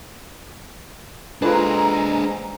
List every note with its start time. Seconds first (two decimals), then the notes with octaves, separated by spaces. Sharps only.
1.42 G#3 D4 F4 A4 B4 C5 A#5